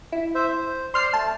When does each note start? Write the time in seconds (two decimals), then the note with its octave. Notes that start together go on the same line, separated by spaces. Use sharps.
0.12 E4
0.35 C5 E5
0.48 C5
0.94 C5 D5 C6 F6 C7
1.13 A3 A5